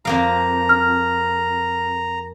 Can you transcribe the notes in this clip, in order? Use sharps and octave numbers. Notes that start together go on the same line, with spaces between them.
F2 A#3 F5 A#5
F6